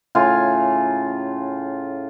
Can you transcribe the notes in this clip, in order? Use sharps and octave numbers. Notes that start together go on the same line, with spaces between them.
A2 C#3 F4 G#5